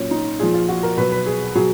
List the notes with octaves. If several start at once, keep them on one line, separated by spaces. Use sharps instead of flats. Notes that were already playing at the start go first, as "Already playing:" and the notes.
Already playing: A#2 F#3 C#4
D#4
A#2 F3 G#4
F4
F#4
A#4
B2 F#3 B4
B4
G#4
B2 F#3 G#4